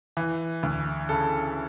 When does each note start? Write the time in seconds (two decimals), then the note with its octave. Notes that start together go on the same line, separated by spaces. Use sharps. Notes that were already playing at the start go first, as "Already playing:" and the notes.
0.17 E3
0.63 D2
1.09 C#3 A4